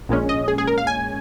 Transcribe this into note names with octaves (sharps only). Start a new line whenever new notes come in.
A#1 A#2 G#3 C#4
D#5
G#4
G#4
A#4
F5
G#5